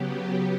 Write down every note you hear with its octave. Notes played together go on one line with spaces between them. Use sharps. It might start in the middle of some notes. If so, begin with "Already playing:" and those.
Already playing: C#3 F#3 B3 G4